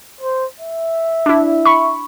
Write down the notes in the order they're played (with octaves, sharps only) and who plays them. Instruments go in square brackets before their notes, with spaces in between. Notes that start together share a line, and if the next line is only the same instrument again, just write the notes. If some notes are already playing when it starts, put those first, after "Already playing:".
[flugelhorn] C5
E5
[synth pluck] D4 E4
B5 C#6